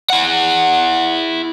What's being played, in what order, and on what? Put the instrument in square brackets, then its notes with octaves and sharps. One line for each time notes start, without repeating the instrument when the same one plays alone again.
[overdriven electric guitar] E4 F#5